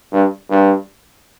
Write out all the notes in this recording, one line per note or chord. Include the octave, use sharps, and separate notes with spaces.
G2
G2